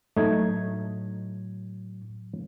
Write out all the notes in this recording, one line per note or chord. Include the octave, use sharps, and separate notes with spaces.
A2 F#3 A3 D#4 G#6